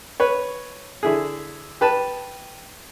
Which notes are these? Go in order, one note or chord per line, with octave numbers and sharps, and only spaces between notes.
B4 C#5
D3 E4 G#4
G4 B4 A5